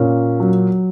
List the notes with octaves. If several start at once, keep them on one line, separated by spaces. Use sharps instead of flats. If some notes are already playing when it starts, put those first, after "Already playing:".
Already playing: A#2 C#4
F#3